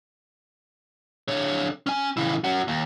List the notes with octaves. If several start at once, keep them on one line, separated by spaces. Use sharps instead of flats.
D3 C#5
C#4 G#5
C#3 E3
C#4 F#4
D#2